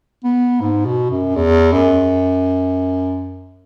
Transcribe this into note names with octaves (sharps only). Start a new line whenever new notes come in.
B3
G#2
B2
F#2
E2
F#2